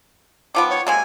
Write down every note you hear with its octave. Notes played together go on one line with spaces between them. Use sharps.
D#3 F3 B3 D6
C#5
C3 G#3 A#3 G#5